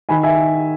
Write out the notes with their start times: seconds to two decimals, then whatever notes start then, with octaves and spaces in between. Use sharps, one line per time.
0.09 D#3 G#5 B5
0.23 E5 G#5